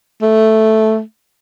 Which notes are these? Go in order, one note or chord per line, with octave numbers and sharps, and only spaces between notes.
A3